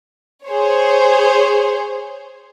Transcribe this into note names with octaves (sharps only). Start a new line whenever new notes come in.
G#4 C5 C#5